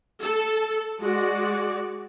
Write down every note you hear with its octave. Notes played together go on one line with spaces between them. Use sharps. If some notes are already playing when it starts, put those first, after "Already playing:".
A4
G#3 F#4 D5